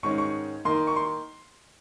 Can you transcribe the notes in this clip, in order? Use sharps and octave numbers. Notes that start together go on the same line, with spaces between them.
G#2 D#3 G#3 C#4 C#6
C#6
D#3 A#3 D#4 C6
C#6
C6